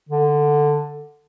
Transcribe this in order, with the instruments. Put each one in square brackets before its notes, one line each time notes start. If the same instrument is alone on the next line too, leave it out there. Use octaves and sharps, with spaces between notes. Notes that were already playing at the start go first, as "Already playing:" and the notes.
[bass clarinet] D3